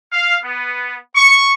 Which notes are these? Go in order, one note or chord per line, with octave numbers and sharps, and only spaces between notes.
F5
B3
C#6